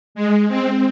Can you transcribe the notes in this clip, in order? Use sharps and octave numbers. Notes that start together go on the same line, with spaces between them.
G#3
C4